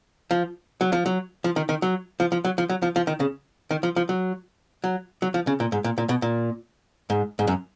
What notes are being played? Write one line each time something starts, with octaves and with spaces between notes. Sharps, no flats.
F3
F#3
F3
F#3
F3
D#3
D#3
F#3
F3
F3
F#3
F3
F#3
F3
F3
D#3
C#3
D#3
F3
F3
F#3
F#3
F#3
F3
C#3
A#2
G#2
A#2
A#2
B2
A#2
G#2
G#2
F#2